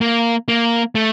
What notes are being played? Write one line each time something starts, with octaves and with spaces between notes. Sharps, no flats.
A#3
A#3
A3